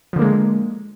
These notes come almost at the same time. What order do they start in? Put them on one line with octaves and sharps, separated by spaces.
F3 D3 A#3 G#3